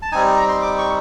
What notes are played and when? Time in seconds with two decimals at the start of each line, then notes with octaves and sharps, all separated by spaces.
0.02 A5
0.12 G3 C4 D#4 G#5
0.36 A#5
0.48 C6
0.62 D6
0.78 C#6